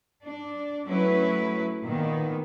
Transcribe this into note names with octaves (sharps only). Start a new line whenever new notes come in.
D4
F#3 A3 C#4 E4 B4
A#2 D#3 B3